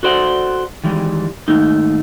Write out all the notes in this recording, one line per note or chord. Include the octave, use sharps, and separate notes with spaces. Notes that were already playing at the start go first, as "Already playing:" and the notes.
F#4 A4 C5 D5 F#5
D#3 E3 G3 G#3
D#2 G#2 A3 D#4